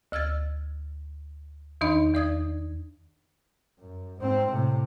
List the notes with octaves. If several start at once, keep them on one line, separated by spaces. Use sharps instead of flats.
D2 E6 F6 G#6 A6
E2 D#3 D4 D#4 D#5 B5
E2 D5 D#6 G#6
F#2
G#2 C4
A2 C3